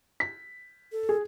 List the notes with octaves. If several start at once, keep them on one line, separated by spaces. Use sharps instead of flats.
B6
A4
G#4